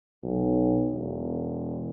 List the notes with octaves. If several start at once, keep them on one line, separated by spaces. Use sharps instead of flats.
B1
E1